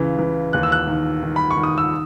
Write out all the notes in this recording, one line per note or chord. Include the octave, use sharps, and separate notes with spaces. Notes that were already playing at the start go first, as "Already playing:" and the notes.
Already playing: C#2 C#3 E3
E3
D#2 F#6
E6
F#6
D#3
D#3
B5
C#6
D#3
D#6
E6